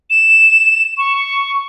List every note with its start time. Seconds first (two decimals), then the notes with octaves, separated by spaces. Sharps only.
0.10 E7
0.97 C#6